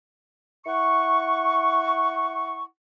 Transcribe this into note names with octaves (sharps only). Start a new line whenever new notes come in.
E4 F#5 C#6